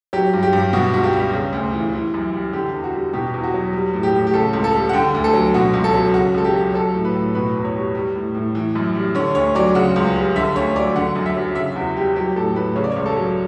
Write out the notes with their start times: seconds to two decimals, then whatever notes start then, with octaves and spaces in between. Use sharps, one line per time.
0.13 F#3 G4
0.33 G2
0.43 G4
0.53 G2
0.73 B2 F#4
0.93 C#2 F#4
1.04 G4
1.13 G3
1.33 C#3
1.53 D2
1.73 E3
1.93 E3
2.14 F#2
2.33 G3
2.53 D3 G4
2.74 E2
2.84 F#4
2.93 G3
3.13 B2 G4
3.34 E2
3.44 F#4
3.54 F#3
3.73 G3
3.94 A2
4.03 G4
4.13 A2
4.27 G4
4.34 C#3 A4
4.53 C#2
4.64 A4
4.74 G3
4.89 F#5
4.93 D3 G5
5.15 D2
5.24 A4
5.34 F#3
5.54 B2 F#4
5.74 C#2
5.84 A4
5.94 F#3
6.14 C#3 F#4
6.34 C#2 A4
6.44 G4
6.54 F#3
6.74 F#3 A4
6.94 A2
7.05 B4
7.15 A2
7.35 B2 B4
7.55 E2
7.65 C#5
7.75 G3
7.95 G3
8.16 A2
8.35 A2
8.55 E3
8.75 F#2
8.95 G3
9.15 D3 C#5
9.35 D2 C#5
9.55 F#3 D5
9.75 C#3 F#5
9.96 C#2
10.16 G3
10.36 D3 E5
10.56 D2 C#5
10.76 F#3 D5
10.96 D3 F#5
11.15 F#2
11.26 E5
11.36 F#3
11.55 C#3 E5
11.75 E2 F#4
11.97 G3 G4
12.16 F#3 G4
12.36 A2 A4
12.56 A2 B4
12.76 C#3 C#5
12.84 D5
12.92 C#2 C#5
13.06 A4
13.16 F#3